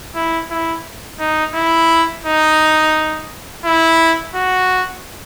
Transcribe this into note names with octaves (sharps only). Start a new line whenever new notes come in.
E4
E4
D#4
E4
D#4
E4
F#4